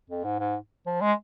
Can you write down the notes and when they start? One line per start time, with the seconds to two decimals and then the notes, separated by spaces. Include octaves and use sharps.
0.10 F2
0.24 G#2
0.40 G#2
0.86 F3
1.01 G#3